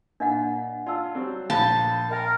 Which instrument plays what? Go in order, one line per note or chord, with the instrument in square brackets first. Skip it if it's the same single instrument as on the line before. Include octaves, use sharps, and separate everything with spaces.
[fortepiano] A#2 [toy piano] D4 D#5 F#5
[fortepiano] F4 [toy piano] D5 A5 E6
[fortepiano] F#3 G3 C4
[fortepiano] A#1 B5 [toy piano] F5 [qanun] A5
[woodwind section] A#4 [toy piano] D#5 G5 A#5